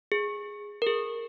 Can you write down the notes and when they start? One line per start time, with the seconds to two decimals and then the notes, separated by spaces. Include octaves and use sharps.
0.12 G#4
0.82 A#4
0.87 G#4